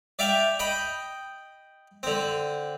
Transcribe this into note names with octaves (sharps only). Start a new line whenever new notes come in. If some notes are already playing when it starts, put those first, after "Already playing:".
D5 E5 F5 G5
D#5 G5 B5
D3 C4